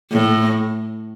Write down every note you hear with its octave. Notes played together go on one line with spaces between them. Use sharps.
A2